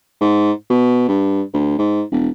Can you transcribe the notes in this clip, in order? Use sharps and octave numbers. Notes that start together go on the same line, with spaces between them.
G#2
B2
G2
D2
G#2
E1